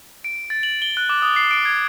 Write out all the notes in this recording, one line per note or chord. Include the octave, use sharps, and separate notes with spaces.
D7
A6
F#7
G7
F#6
D6
D#6
C7
D7
G#6